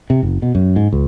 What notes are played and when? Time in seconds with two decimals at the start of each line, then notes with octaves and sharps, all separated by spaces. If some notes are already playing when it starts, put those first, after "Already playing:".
0.10 C3
0.23 F#1
0.42 B2
0.55 F#2
0.76 G#2
0.93 C#2